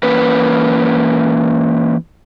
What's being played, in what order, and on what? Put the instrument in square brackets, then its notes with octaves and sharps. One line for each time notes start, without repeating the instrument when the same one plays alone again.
[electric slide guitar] E3 A#3 C#4 B4